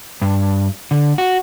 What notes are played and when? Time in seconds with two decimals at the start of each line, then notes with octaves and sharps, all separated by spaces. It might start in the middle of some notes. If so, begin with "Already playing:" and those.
0.22 G2
0.91 D3
1.18 F#4